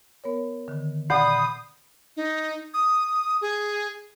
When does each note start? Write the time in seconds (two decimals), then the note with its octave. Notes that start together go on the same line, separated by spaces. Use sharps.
0.24 B3 A#4 C#5
0.68 D3 D#3
1.10 A#2 D5 F#5 B5 D#6 G6 C7
2.17 D#4
2.74 D#6
3.41 G#4